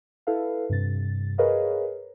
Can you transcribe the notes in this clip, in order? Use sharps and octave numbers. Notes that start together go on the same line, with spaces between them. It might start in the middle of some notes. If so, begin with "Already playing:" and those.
E4 A4 B4 F5
G2 C3 A6
G#4 A#4 B4 C#5 D#5 F5